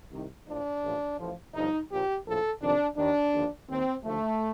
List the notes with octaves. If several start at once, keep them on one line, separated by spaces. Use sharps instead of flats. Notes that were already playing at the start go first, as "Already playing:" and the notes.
C2 C3 D#3
A#1 A2 F3 D4
A1 A2 F3
A1 A2 F3
G1 G2 D3 F3 D#4
A#1 A#2 F3 G4
A#1 A2 F3 A4
F2 C3 D#3 D4
D#2 D#3 D4
D#2 D3 F3
D#2 D#3 C4
D#2 D3 F3 A3